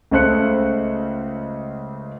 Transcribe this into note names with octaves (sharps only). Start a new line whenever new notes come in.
C#2 C#3 A3 C5 F#6 C#7